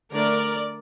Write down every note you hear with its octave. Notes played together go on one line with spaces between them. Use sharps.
D3 A3 D4 A#4 D5